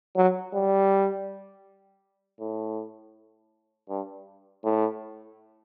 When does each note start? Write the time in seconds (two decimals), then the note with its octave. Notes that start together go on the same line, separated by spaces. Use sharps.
0.16 F#3
0.53 G3
2.40 A2
3.89 G2
4.64 A2